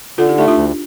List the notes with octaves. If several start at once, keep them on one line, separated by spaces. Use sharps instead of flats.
D3 F4 A4
D#4 G4
A3 D#4 G4
D4 F4
D2